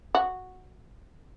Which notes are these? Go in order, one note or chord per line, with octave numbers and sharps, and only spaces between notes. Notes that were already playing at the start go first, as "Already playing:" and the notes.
F#4